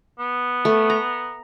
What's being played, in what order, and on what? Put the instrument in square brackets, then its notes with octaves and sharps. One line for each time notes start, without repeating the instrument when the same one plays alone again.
[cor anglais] B3
[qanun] A3
A#5